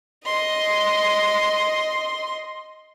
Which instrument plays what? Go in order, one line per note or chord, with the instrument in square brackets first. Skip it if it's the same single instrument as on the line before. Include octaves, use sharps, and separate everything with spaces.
[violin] D#5 C6